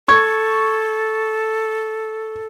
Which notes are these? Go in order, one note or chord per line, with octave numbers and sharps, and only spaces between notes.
A4 C#6 G#6